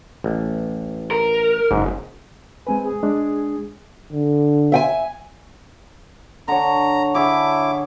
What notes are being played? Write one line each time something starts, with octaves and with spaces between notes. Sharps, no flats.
A1
A#4
F#1 G#2
G#3 C4 B4 G#5
G#4
G#3 D4
D3
E5 G5 G#5
D3 C#5 A#5
D3 E4 G#4 C#5 D6